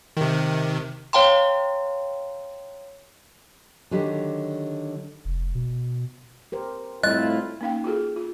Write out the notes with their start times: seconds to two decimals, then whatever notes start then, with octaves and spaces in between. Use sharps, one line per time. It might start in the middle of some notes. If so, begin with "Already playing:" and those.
0.17 C3 D#3
1.13 C#5 F5 G5 A#5 C6
3.91 D3 D#3 F#3 G4
5.25 F1
5.55 B2
6.52 G4 A#4 C5
7.03 A2 G3 C4 E4 F4 D#5 F#6
7.61 A#3 C#4 D#4 F5 G5
7.84 F4 F#4 G#4 A4
8.16 F4